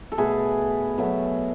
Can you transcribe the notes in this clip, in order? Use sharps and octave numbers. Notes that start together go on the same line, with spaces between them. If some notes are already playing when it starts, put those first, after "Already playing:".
A4
B2 A3 G#4 B4
B2 F#3 A3